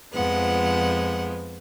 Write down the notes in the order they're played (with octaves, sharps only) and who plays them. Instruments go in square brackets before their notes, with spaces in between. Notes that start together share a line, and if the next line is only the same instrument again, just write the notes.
[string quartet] F2 F3 G#3 B3 F#5